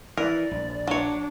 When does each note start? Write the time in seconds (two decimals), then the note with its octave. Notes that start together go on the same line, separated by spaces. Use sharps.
0.17 E3 A#4 D5
0.51 A#1
0.87 F#3 D4 C#5